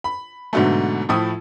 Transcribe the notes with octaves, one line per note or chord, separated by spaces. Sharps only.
B5
G#2 B2 D3 F#3 A3
A2 F3 A3 E4 D#6